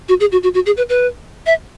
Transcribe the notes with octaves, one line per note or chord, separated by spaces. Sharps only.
F#4
G#4
F#4
F#4
F#4
G#4
B4
B4
E5